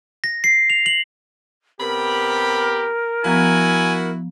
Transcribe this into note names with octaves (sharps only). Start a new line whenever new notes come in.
A#6
C7
F7
F#7
C3 B3 G4 A#4 B5
F3 B3 E4 F#4 G#5 A#5